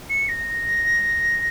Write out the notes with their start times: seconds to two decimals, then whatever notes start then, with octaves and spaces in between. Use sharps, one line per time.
0.09 C#7
0.28 A#6